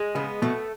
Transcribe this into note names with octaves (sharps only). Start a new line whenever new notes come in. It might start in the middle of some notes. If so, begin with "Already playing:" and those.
Already playing: G#3
C#3 B3
B2 A3